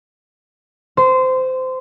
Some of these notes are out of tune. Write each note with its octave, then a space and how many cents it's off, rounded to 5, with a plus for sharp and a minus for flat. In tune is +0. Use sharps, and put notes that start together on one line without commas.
C5 -20